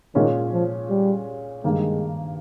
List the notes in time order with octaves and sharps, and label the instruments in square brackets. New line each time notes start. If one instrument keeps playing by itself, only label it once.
[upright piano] A#2 G#3 C#4 [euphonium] D#3
[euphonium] F3
G3
[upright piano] G2 D#3 A#3 [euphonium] G#3